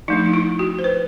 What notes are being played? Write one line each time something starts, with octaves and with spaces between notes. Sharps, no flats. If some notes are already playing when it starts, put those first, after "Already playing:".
F3 A3 D4 D#4
D#4
E4
F#4
C5
B4